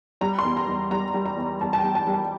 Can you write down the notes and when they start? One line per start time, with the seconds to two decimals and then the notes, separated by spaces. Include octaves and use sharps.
0.21 G3 A#5
0.39 C6
0.44 E2
0.57 A#5
0.68 E2
0.91 G3 A#5
1.14 G3
1.26 A#5
1.37 E2
1.61 E2 A5
1.73 A5
1.78 G5
1.84 G3
1.95 A5
2.07 G3
2.13 A5